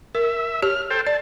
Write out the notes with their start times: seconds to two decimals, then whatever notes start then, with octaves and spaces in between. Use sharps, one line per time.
0.15 A#4 E5
0.62 G4 C#5 F6
0.90 A4 C5 G5
1.07 D5 A5